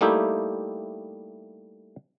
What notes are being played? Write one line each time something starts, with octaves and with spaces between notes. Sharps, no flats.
G3 A3 A#3 D#4 E4 G4